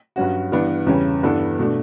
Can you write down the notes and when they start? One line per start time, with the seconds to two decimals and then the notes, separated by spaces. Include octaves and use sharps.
0.16 G2 F#3 C#4 F#4
0.52 G2 E3 B3 D4
0.87 E2 C#3 G3 C#4
1.23 G2 E3 B3 D4 A4
1.59 B2 A3 D4